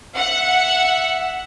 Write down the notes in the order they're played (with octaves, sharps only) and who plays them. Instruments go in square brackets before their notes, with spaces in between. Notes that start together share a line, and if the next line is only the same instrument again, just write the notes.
[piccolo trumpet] E5 [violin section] F#5